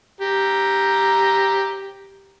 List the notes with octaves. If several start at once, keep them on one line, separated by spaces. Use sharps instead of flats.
G4 A#5